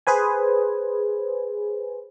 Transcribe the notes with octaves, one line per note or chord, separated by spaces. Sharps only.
G#4 B4 C5 G#5